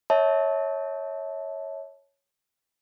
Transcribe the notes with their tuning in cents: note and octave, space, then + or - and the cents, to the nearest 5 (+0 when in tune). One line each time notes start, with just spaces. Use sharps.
C#5 +0 E5 -35 A5 -15